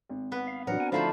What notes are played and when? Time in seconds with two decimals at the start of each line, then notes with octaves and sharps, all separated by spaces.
0.09 G#1
0.32 B3 B4
0.47 F5
0.67 A2 E3 F#3 C4 D4 F#4 A#4 F#5
0.80 B3 G#5
0.92 D3 F3 A3 D#4 F4 C5 F5 B5